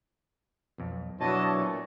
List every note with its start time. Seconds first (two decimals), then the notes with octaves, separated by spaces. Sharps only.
0.78 B1 F2
1.21 B2 F#3 B3 D4 E4 C#5 D#5 A5
1.52 A#2